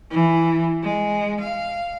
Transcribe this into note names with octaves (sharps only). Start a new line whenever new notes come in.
E3
G#3
F5